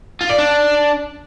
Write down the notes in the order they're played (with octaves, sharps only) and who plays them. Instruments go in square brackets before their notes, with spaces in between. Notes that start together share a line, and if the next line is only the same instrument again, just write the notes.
[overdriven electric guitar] F4
D5
D4